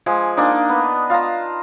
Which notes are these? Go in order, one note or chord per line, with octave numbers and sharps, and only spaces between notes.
F3 G#3 G#5
A#3 D4 D#4
B3
F4 F5 A5 A#5